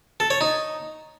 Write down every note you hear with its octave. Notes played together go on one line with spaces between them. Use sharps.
A4
C#5
D#4